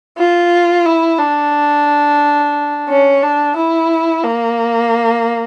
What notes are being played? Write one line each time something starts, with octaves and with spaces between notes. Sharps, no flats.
F4
E4
D4
C#4
D4
E4
A#3